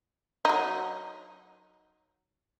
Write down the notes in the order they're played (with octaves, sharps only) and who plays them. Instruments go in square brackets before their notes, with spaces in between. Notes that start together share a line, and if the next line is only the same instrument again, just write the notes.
[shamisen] F#3 D#4